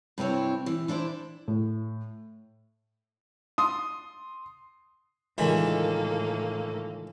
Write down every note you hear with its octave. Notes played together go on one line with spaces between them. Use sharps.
G2 C3 C4 E4 C#5
E3
E3 D4 E4 C5
A2
C6 D#6
C#2 A2 D#3 E3 A#3 A4